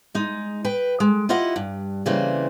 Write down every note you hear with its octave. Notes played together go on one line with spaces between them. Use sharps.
G#3 D#4
B4 G5
G#3
E4 F4 G4 D#5 F#5
G2
C#3 E3 G3 A#3 C4